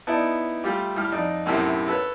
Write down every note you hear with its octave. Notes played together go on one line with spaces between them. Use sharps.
B3 D#4 E4 D5 A5
G3 A3 F4 G4
A2 G3 F6
F2 D#4 D5
B1 F#2 A2 C3
A4 B4 C#5